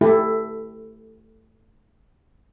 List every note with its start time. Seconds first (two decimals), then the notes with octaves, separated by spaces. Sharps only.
0.01 A3 E4 G4 A4